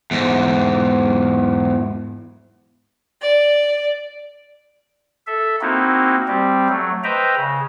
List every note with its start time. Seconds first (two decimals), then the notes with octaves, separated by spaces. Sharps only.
0.11 E2 G#2
3.22 D5
5.27 A4 E5
5.61 A#3 C4 D#4 E4 F#4
6.28 G3 C4 G4
6.69 F#3 A3
7.04 B4 C5 D#5 E5 G5 A#5
7.36 C#3